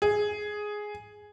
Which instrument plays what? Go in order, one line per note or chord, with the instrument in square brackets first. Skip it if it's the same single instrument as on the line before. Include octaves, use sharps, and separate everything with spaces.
[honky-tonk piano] G#4